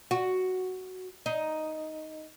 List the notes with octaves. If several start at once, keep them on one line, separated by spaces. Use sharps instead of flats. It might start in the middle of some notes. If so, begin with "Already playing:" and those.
F#4
D#4